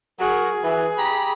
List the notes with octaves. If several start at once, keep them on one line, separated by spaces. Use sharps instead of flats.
F#3 F#4 G#4 A#4
E3
G4 A#5 B5